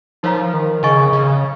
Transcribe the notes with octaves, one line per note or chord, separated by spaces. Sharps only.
F3 D#4 A#4 C#5 F5 A#5
D#3
C#3 G#4 D#5 G#5 C#6
C#3